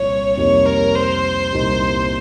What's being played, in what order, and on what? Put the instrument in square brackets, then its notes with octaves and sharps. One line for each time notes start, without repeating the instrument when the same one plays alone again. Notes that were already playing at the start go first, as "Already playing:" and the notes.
Already playing: [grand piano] C2 A#2 F3 A#3 [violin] C#5
[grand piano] F2 C3 G3 A#3 D#4 [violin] C#5
[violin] A#4
C5
[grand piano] C2 A#2 G3 A#3 D#4